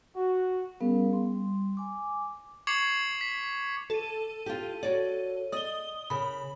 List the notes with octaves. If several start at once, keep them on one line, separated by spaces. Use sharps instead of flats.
F#4
G3 B3 C#4 G#4 A#4 F5
G3 C6
G#5 D6
C#6 D6 G#6 C7 C#7 F#7
B6
A4 D#7
F4 G4
F#4 C#5 D5
D5 D#5 D#6 G7
C#3 A#4 B5